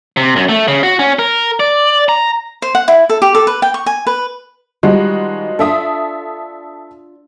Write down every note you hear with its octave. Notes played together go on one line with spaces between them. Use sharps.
C3
F#2
A3
C#3
F#4
C#4
A#4
D5
A#5
C5
F#5
E4
A4
G4
A4
B4
G5
C#6
G#5
B4
D#3 F3 G3 G#3 F#4
D4 F4 A4 E5 D#6